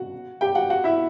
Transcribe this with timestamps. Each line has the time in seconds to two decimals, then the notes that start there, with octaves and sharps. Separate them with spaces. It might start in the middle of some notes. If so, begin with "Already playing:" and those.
Already playing: F#4 F#5
0.41 G4 G5
0.55 F#4 F#5
0.70 F#4 F#5
0.84 E4 E5